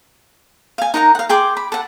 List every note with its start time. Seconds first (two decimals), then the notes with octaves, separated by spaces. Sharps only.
0.78 F5 G#5
0.94 D#4 A#4 F#5 A#5
1.15 F5 F#5
1.29 G#4 G5 C6 D6
1.57 B5
1.72 A4 F#5